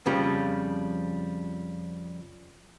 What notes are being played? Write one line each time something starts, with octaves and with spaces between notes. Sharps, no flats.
F2 C#3 F3 G3